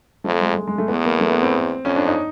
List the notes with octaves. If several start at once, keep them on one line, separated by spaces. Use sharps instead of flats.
F2 A3
G#3
G#3
G#3
A3
E2 B3
A#3
A3
B3
C4
F2 C#4
D4
D#4